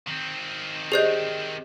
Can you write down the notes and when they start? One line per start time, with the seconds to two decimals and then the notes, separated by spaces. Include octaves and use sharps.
0.07 D#3 C4
0.92 G4 G#4 C5 D5 D#5 G6